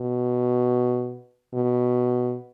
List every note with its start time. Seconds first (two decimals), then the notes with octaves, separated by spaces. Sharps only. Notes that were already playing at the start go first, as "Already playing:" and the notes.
Already playing: B2
1.54 B2